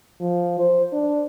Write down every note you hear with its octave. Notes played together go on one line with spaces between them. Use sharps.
F3
C5
D4